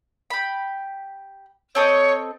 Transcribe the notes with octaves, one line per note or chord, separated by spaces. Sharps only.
G4 B5
C4 A4 C#5 D#5